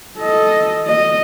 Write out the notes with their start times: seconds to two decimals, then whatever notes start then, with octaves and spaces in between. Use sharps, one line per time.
0.18 A4 D#5
0.87 D#5